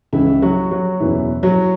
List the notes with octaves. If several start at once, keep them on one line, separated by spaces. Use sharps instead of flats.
C#2 C#3 E3 E4
F#3 F#4
F#3 F#4
F#1 E2 B2 E3 F#3 E4
F#3 F#4